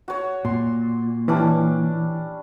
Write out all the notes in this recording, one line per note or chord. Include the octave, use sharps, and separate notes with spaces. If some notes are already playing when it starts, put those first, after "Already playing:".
F#4 C#5
A#2 C6
E3 G3 C#4 D4